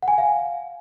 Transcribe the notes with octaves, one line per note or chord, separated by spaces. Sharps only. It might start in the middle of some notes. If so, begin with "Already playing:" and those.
F#5
G#5
F#5
F5